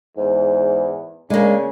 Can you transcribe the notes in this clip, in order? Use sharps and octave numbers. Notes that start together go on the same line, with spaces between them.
E2 G#2
C#3 G#3 A#3 D4